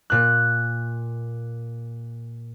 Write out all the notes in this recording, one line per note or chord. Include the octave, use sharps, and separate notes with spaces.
A#2 F#6